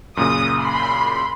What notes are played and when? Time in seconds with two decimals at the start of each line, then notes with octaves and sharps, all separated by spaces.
0.17 F#2 A#2 C#3 D#6
0.59 B5 C6